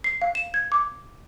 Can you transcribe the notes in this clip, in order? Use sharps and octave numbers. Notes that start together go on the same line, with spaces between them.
C7
F5
E7
G#6
D6